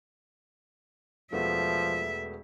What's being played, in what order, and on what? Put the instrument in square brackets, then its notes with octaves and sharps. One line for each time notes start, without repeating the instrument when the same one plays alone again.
[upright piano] E1 A3 B3 [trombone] F3 [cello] E5